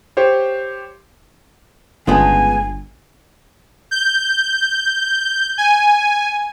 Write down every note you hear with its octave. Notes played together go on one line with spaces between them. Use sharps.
G4 C5 C#5
G1 C#3 G#3 B3 F4 G#5 A5
G6
G#5